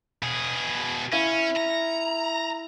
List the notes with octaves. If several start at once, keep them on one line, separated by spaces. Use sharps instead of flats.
B2 G#4
C#4 E4 F5
A#5